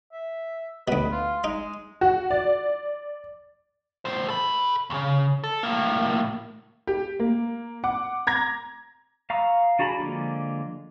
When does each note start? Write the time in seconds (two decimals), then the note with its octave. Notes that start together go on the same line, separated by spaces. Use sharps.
0.12 E5
0.88 D2 B2 B4
1.12 F4
1.44 G#3 D#4
2.01 F#4
2.30 D5
4.05 A2 C5
4.28 A4 B5
4.90 D#2 C#3
5.44 A4
5.63 A2 A#3
6.87 G4
7.19 A#3
7.84 F#5 D6
8.27 A#5 G#6 A#6
9.30 F5 A#5 C#6 D#6 E6
9.79 D4 F#4 G#4 A#5 B5
9.99 D3 F3 G#3 A#3